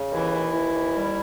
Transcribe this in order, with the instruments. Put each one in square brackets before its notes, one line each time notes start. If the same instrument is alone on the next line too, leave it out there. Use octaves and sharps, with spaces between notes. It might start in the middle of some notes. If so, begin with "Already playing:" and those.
Already playing: [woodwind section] C#3
D#2 E3 E4
D#2
E3
D#2
G3